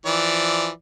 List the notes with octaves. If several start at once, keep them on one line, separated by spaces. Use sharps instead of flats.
E3 F3 D5